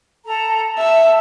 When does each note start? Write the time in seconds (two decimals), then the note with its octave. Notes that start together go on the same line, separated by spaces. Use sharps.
0.25 A4 A#5
0.78 E5 A5